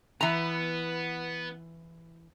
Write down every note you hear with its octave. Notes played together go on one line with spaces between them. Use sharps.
E3 B3 A#5